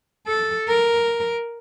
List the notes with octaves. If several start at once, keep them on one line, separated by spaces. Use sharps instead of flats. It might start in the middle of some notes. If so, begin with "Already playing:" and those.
A4
A#4